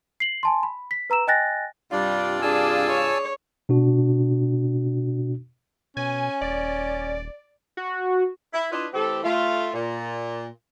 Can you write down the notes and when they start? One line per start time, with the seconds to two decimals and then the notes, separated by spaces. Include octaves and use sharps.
0.20 C7 F#7
0.43 G#5 A5 C6
0.63 B5
0.91 B6
1.10 B4 A#5 E6 E7
1.27 D#5 G5 G#5 F#6 A6 A#6
1.92 G2 C3 G3 D4 F4 D5
2.42 D4 G#4 D5 G#5 A5 E6
2.89 C#5
3.69 B2 D4 F#4
5.97 B2 C#4 G#5
6.41 D#1 D5
7.77 F#4
8.53 E4
8.72 D4 E4 F4 B4 D5 D#5
8.93 E3 A3 C4 G4 A4
9.23 A3 F4
9.74 A#2